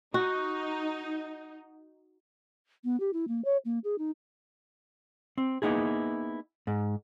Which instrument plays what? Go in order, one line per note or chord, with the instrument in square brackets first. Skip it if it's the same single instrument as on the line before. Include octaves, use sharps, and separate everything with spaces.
[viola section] D#4 [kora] F#4
[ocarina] B3
G4
E4
A#3
C#5
A#3
G#4
D#4
[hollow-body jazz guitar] C4
A#3 B3 D#4 E4 G#4
G#2